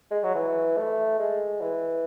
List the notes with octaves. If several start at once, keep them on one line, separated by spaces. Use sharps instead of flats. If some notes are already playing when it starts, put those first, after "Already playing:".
G#3
F#3
E3
A3
G#3
E3